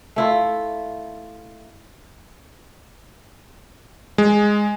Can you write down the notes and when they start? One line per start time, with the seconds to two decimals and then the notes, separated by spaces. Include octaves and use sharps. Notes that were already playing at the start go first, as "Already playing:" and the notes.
0.16 A3 E4 F4
4.18 G#3